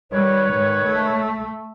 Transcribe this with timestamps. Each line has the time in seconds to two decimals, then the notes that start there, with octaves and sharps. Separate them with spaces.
0.12 D#3 G3 B4 C#5
0.52 G#2
0.84 A3